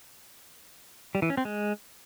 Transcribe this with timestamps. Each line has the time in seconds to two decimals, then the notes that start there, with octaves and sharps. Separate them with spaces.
1.15 G3
1.22 E3
1.30 C#4
1.37 C4
1.45 G#3